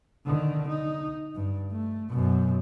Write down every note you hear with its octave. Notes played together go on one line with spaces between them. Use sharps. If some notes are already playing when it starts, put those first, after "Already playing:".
D3 D#3
D#4
G2
A3
F#2 B2